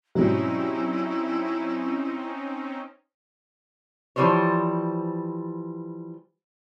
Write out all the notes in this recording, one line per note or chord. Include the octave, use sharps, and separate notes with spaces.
G#2 B2 F#3 G3 C4 C#4 D#4 E4
E3 F3 G3 C5 C#5